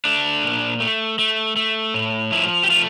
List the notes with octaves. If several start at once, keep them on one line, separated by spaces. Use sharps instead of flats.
A3 D4
A#2
A3
A3
A3
A2
F3 E4
G4
A3 F4